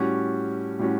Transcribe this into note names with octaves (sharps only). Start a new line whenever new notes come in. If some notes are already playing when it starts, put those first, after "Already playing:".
Already playing: A2 G3 C#4 F#4
A2 G3 C#4 F#4